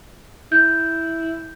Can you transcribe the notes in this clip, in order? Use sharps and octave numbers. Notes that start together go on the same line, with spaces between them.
E4 G6